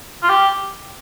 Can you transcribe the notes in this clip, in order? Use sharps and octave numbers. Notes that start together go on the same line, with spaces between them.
F4
G4